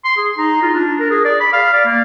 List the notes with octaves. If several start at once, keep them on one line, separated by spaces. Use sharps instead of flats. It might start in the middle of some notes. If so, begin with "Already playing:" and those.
C6
G#4
D#4
F4
D4
A#4
G#4
D5
B5
F5
D5
A#3